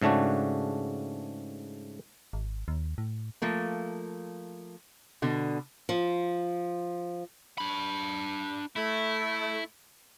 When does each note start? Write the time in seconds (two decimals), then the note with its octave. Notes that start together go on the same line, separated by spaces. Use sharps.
0.02 G#2 C#3 A3 D4 F#4
2.33 G#1
2.68 D#2
2.98 A2
3.42 F3 A3 A#3
5.22 B2 D3
5.89 F3
7.58 D4 B5
8.76 A3 E4